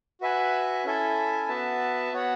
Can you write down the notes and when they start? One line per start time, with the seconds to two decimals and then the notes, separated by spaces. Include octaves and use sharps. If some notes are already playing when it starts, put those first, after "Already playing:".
0.21 F#4 B4 E5 G#5
0.84 C#4 E4 A4 E5 G#5
1.49 B3 F#4 B4 E5 A5
2.13 B3 F#4 C#5 F#5